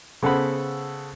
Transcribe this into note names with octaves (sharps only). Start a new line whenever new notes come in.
C#3 B3 A4 C5 F#5 B5